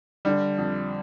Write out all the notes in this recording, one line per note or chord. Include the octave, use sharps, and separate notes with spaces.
D3 G3
F2